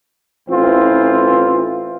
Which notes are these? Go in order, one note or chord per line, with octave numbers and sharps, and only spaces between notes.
A1 E3 C4 F4